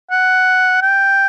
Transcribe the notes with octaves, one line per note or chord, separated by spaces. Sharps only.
F#5
G5